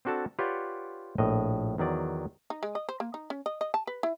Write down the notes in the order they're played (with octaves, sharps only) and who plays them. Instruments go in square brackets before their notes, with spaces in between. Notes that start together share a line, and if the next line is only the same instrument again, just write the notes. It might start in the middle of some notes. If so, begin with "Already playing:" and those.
[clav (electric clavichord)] C4 D4 F#4 A4 A5
F4 G4 B4 C#5 D5 F#5
A#1 A2 D#5
E2 D#3 F#3 D5
[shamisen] D#4
G#3
D#5
C5
A#3
D#4
C#4
D#5
D#5
A5
B4
E4